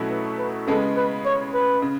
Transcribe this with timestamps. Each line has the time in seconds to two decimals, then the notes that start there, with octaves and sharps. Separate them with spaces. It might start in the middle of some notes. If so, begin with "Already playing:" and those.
Already playing: B2 F#3 A3 C#4 E4
0.10 B4
0.38 B4
0.67 C#3 G#3 B3 A4
0.96 B4
1.25 C#5
1.54 B4
1.82 C#3